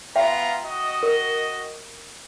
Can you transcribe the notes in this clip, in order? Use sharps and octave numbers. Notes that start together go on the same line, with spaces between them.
B3 F4 E5 G5 A#5
F#4 D#5
A#4